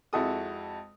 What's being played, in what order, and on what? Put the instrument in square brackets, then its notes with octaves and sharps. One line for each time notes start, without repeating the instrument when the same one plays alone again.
[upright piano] F2 G#3 E4 F#4 A4 D#6